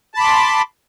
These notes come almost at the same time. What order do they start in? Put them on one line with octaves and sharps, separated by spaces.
A5 B5 D6 C6